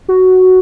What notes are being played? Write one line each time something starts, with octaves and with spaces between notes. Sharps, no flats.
F#4